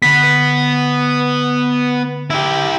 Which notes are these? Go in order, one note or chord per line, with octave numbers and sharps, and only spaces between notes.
D3 B3 B4 B6
E4 G4